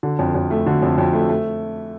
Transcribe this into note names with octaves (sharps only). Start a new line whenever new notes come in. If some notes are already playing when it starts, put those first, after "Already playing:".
D3
F2
F2
A3
D3
F2
F2
A3
A3